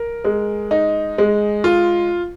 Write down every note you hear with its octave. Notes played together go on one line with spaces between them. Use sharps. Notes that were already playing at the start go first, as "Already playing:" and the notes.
Already playing: A#4
G#3
D#4
G#3
F4